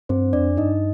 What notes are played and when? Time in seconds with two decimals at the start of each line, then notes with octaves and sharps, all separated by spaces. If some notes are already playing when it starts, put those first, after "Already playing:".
0.09 G2 C4 C5
0.33 F2 D4 D5
0.57 G2 D#4 D#5